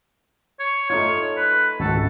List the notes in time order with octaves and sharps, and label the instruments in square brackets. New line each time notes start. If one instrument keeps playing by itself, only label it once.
[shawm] C#5
[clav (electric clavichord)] A3 D#4 F4 [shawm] C#5
[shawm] B4
[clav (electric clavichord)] G#1 C#2 F#4 [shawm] A4